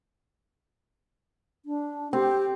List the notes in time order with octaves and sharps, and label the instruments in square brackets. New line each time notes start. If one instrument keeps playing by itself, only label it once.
[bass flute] D4
[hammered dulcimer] C4 [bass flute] G4